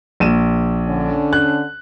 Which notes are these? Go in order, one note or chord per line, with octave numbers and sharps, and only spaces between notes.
A#1 D#7 E7
D3 C#4 D4
F#6